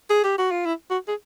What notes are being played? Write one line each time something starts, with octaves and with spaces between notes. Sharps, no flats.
G#4
G4
F#4
F4
E4
F#4
G#4